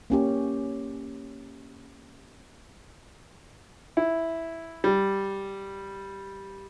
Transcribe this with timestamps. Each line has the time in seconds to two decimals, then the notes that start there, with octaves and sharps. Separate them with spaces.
0.10 A#3 C#4 G4
3.97 E4
4.84 G3